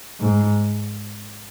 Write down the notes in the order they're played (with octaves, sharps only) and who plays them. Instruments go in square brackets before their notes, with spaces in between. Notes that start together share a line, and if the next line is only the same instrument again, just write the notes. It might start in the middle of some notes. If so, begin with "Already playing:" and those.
[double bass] G#2